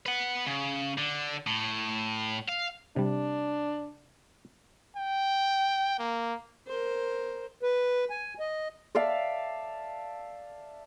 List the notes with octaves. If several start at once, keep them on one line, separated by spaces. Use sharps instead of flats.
B4 F#5
C#3
D3
A2
F5
C3 G3 D4
G5
A#3
A#4 C5
B4
G#5
D#5
D5 E5 F5 A5